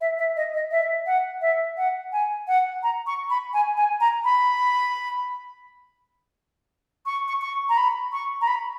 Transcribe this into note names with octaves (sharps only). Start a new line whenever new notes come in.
E5
E5
D#5
D#5
E5
F#5
E5
F#5
G#5
F#5
A#5
C#6
B5
G#5
G#5
A#5
B5
C#6
C#6
C#6
A#5
B5
C#6
A#5
B5